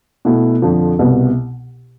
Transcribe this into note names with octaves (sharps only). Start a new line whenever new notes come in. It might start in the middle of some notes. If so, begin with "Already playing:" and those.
B2 A3 E4
F2 D3 F3
C2 B2 B3